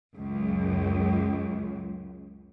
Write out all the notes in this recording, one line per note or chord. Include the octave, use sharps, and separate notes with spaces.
C#2 F#2